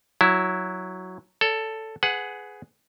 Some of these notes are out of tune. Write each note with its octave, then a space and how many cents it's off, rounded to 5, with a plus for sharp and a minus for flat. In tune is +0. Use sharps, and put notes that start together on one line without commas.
F#3 +0 E4 +0
A4 +5 C#5 +40
G#4 +10 B4 +25 F#5 +0